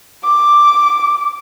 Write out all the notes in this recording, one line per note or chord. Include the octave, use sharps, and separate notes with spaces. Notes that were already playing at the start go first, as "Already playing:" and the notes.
D6